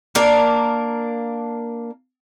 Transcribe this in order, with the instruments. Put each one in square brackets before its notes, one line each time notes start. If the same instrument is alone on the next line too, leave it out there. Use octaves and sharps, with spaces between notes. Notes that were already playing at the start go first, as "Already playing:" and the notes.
[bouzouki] A#3 D4 A#4